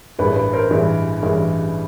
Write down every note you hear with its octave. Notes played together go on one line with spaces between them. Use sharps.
A1 G2 E3 G#3 B4
B4
A#4 C5
A1 G2 E3 G#3 B4
A1 G2 E3 G#3